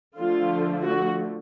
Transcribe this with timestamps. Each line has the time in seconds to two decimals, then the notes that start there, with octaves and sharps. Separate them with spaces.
0.17 D3 F3 A3 F4
0.84 F#4